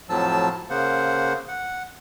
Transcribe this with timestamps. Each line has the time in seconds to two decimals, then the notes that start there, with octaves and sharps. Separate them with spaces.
0.09 F2 A2 F3 F#3 A5 E6
0.70 C#3 A#3 C5 F#5
1.48 F#5